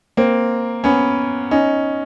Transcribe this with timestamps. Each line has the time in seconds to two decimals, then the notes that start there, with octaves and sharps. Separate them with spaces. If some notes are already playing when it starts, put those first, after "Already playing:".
0.17 A#3 C4
0.84 B3 C#4
1.51 C#4 D#4